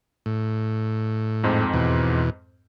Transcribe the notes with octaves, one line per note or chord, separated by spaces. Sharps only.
A2
F2 G#2 C4
E2 B2